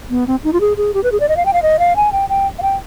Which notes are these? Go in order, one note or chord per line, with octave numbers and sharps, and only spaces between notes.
B3
C4
D#4
F4
G#4
G#4
G4
B4
G#4
D5
D#5
F5
G5
F5
D#5
F5
G#5
G5
G5
F5
G5